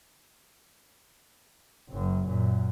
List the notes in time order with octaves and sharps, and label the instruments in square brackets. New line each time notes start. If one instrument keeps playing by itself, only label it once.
[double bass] F#1 F#2
F#2 A#2